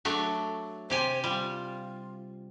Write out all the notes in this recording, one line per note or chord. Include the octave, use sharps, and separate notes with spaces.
F#3 A3 D4
C3 G4 C5 G#5
G3 F4